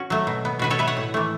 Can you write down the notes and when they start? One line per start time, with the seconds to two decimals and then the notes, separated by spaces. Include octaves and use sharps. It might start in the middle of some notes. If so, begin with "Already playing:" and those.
Already playing: C#4 F#4
0.10 F#3 A3
0.27 B2
0.45 B3
0.59 B2 F#4 B4
0.70 A4 C#5
0.79 B3 B4 E5
0.87 C#5 F#5
0.97 A2
1.14 E3 A3